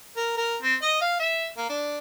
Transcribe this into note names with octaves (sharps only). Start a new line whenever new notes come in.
A#4
A#4
C4
D#5
F5
E5
A#3
D4